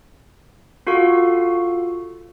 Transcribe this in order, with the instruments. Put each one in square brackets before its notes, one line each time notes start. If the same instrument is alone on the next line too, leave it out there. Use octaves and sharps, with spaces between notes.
[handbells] F4 F#4 A4 F5 C#6